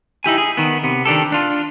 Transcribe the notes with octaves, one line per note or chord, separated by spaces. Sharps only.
D#4 E4 G4 G#5
G#4
D#3 B3
C3 B3
D#3 D4 G4 A4
D4 F4